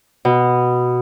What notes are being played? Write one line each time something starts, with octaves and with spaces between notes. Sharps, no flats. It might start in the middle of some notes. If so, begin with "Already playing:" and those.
B2